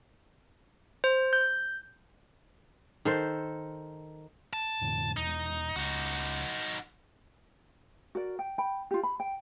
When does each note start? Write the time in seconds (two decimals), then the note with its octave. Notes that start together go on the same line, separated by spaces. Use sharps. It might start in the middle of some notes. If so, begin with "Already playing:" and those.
1.04 C5
1.33 G6
3.05 D#3 A4 C5
4.53 A5
4.81 F2 A2 D3
5.17 D#1 E2 D#4
5.76 C#2 D#4 F#4
8.15 F#4 A#4 D5
8.39 G5
8.58 G5 B5
8.91 F4 G4
9.03 B5
9.20 G5